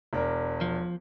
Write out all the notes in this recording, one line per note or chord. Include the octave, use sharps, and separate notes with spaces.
E1 D4 A#4
F3